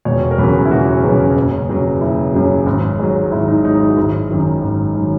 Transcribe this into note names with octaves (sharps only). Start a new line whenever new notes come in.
E1 C#5
A#4
E2 C#3 F#3 B4
E4
E1 F#4
E2 C#3 F#3
F#1
F#2 C#3 F#3
F#1 E4
F#2 C#3 F#3
G#1
G#2 F#3
G#1 E4
D#4
G#2 F#3 D#4
E4
F#4
G#1 E4
F#2 D#3 F#3
G#1
D#3 F#3